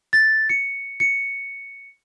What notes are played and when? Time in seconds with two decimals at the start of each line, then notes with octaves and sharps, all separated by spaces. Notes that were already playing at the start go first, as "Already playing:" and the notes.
0.13 A6
0.49 C#7
1.00 C#7